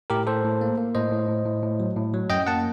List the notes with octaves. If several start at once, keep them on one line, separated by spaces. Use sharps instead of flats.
A2 G4 A#4
A2 A4 C5
A2
A#3
A#3
A2 C5 D#5
A2
A2
A2
A2
F#3
A2
F#3
F#2 D#5 G5
A#3 F#5 A5